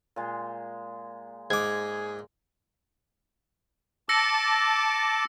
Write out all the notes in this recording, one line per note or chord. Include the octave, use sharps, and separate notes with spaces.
A#2 G#3
G#2 G#4 D6 G#6
A5 D6 E6 A#6 C#7